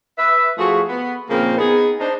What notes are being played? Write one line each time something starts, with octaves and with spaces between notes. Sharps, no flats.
B4 E5
F3 A3 F4 F#4 G#4
B3
A#2 C#3 F3 A#3 C4 C5
B3 D#4 G#4
D4 D#4 C5